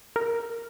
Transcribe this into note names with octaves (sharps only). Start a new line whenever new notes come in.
A#4